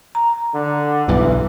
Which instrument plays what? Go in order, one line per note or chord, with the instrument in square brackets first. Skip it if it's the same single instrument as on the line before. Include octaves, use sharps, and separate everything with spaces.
[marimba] A#5
[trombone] D3
[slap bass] B1 G2 [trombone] E3